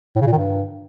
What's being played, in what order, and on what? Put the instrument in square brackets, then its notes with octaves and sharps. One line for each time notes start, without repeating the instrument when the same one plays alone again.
[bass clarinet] A2
C#3
A#2
D#3
G2